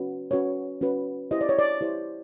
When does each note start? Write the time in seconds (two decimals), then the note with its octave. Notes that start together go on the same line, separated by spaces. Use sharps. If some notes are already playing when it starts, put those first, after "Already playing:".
Already playing: C#4 F#4 B4
0.31 C#4 F#4 B4 C#5
0.81 C#4 F#4 B4
1.31 E4 G4 C5 D#5
1.41 D5
1.49 C#5
1.59 D5
1.81 E4 G4 C5